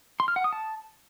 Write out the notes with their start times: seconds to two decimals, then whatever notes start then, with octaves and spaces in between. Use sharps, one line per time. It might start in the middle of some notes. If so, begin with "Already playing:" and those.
0.20 C6
0.28 F6
0.36 F#5
0.44 D#6
0.53 A5